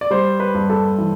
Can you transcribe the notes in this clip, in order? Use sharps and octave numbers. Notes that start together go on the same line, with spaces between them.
D5
G3 C5
B4
G2
A4
E3